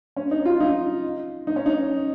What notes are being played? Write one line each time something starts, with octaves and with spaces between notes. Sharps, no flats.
C#4
D#4
F4
D#4
D#4
C#4
D#4